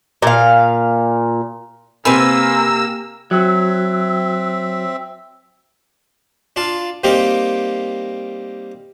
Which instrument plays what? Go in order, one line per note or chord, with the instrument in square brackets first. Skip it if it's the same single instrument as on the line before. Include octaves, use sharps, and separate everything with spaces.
[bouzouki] A#2 F5
[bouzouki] C3 B4 G#5 [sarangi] A#3 [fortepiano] C4 A#4 B5 [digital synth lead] E6
[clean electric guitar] F#3 [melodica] C4 E5
[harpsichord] D4 F4 F5 A5
G3 A#3 C4 D#4 G4 A#4